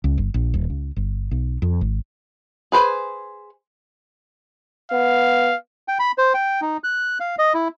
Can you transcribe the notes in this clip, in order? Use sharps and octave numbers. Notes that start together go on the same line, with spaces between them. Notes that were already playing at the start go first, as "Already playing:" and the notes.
C#2
G1
A#1
D#1
C#2
G1
B1
F2
G#1
G#4 B4 C5 G#5
B3 F5
G5
B5
C5
G5
D#4
F#6
F5
D#5
E4